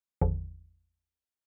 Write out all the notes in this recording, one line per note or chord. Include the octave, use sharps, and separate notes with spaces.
G#1 E2 D3 F3